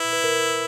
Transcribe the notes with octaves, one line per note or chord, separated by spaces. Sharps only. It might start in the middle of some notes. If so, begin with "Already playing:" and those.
Already playing: E4 B4
B4
A#4